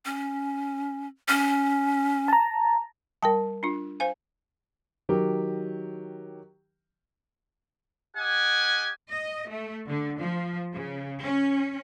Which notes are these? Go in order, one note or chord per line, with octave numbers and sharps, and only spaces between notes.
C#4
C#4
A5 A#5
G3 A#4 G5 A5
D4 F4
C5 F5 G#5
D#3 F#3 G4 A#4
G4 D#5 F#5 G#5
D#5
A3
D3
F3
C#3
C#4